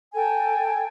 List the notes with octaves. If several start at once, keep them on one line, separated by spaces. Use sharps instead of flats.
A4 G5 G#5